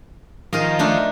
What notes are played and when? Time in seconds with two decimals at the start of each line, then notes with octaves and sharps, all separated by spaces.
0.53 D#3 F3 G#4 A#4 D#5
0.79 A3 D4 D#4